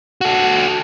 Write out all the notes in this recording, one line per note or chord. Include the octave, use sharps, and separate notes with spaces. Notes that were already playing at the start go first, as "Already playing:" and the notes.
F#4 A4